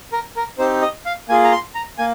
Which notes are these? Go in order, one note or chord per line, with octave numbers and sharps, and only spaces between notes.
A#4
A#4
C4 D#4 G4 C5
D#5
F5
A#3 F4 G#4 G#5
A#5
C6
A#5
A#3 G#5